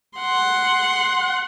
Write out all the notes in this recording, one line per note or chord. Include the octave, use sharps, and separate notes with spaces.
F#5 C6